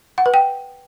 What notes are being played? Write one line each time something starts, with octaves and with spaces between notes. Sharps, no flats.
F#5
B4
G5